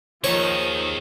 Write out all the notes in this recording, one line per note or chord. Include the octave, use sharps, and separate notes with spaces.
D#2 D#3 F3 G#4 C#5